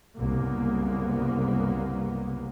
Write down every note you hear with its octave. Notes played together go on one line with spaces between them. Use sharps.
C2 F#2 C#3 A#3 B3